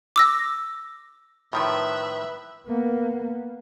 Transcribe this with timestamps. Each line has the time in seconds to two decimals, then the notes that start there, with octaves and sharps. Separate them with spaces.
0.16 D6 E6 A#6
1.53 A2 D#3 F3 B4 E5
2.67 A#3 B3